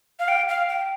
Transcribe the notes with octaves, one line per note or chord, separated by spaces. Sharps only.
F5
G5
F5
G5